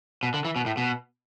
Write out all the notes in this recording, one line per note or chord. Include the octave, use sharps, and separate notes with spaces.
B2
D3
E3
B2
A2
B2